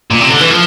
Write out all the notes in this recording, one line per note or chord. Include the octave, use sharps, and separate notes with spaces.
A#2
C3
D3
E3
F3